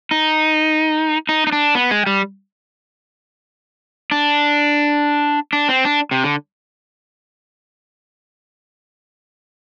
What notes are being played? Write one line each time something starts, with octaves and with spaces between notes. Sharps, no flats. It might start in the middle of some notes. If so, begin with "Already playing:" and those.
D#4
D#4
D#4
D4
B3
G#3
G3
D4
D4
C4
D4
C3
D3